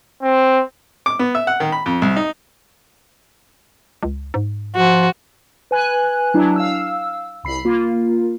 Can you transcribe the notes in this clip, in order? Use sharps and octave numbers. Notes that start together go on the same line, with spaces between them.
C4
D6
B3
E5
F#5
D#3
B5
F2
C2
D#4
C#2
G#2
F3 F#4
B4 G#5 F#6
F#3 D4 E4
F5 E6
C2 B5 C7
A#3 F4